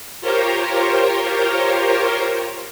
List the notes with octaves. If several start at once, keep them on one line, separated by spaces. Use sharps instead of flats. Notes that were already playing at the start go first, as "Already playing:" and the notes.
F4 G4 A#4 C5 C#5